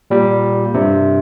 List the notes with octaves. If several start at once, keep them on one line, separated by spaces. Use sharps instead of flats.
A#2 G3
G2 C3